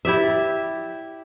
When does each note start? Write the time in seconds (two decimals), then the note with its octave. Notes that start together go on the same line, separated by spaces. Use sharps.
0.05 E4 G4 D5 E5